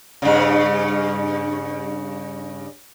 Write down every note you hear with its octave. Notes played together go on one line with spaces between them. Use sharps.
G2 C#3